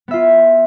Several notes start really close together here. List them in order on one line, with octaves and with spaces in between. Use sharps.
B3 E5 F4